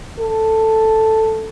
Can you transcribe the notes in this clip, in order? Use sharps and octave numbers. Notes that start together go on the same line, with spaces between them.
A4